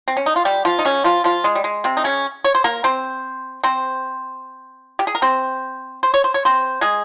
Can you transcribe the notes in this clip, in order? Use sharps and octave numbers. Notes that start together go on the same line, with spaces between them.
C4
C#4
D#4
F4
G3 G4
F3 F4
D#4
C#3 C#4
F3 F4
F3 F4
G#3
G3
G#3
C3 C4
D#4
C#3 C#4
C#5
C5
A#3 A#4
C4 C5
C4 C5
G4
G#4
A#4
C4 C5
C5
C#5
C5
C#5
C4 C5
G#3 G#4